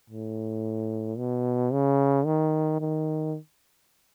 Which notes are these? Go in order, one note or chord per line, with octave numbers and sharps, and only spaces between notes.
A2
B2
C#3
D#3
D#3